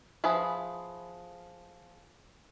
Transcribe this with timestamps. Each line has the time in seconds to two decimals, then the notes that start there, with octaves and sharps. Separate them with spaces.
0.24 F3 G#4 B4 E5 B5